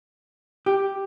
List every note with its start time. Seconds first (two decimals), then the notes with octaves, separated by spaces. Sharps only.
0.66 G4